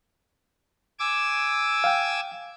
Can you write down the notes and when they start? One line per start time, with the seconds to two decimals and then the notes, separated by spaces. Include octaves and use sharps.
0.99 G#5 D6 E6
1.84 F5 G5